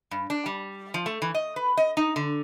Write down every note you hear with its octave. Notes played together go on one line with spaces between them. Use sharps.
G2
D4
G3
F3
A3
E3
D#5
B4
D#5
D#4
D3